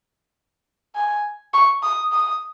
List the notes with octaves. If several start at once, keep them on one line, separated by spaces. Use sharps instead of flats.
G#5
C#6
D#6
D#6